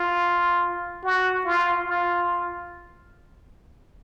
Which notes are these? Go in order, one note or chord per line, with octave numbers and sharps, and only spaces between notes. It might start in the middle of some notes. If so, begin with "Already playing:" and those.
Already playing: F4
F#4
F4
F4